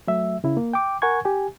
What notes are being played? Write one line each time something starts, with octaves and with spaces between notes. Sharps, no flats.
F#3 A3 E5
C#3 E4
A#3
G5 D6
A#4 F#5 G#5 C#6 G#6
G4 G#5